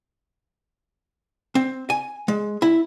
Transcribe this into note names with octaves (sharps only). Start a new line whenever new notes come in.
C4
G#5
G#3
E4